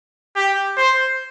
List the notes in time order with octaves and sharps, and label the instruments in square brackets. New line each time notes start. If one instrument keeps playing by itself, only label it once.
[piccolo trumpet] G4
C5